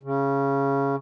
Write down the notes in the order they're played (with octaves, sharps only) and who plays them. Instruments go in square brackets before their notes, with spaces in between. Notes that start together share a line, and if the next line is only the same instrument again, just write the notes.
[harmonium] C#3